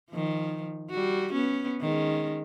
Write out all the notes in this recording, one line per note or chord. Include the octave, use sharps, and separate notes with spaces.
D#3 F3
G3 F#4
B3 C#4
D#3 G#3 C#4